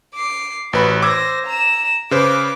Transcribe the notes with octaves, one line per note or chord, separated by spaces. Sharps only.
D6 C7
A1 F#4 B4 C5 B5
C5 D6 E6 G#6 A#6
A#5 E7
C#3 B4 C5 D6